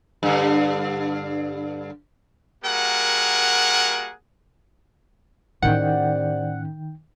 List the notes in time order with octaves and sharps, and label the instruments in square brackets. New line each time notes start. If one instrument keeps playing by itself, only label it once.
[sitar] G2 D3
[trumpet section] G3 A#3 F#4 G#4 A#4 F#5
[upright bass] A2 C#4 [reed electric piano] D#3 G5 [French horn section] G4 C5 D5 [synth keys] F#5